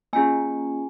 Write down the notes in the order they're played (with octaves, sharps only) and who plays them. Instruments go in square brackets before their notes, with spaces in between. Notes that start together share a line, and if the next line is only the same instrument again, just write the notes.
[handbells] A#3 C#4 F4 G#4 G#5